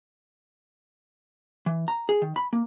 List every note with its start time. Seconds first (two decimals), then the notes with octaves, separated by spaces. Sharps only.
1.66 E3
1.88 A#5
2.09 G#4
2.22 D#3
2.36 B5
2.53 A#3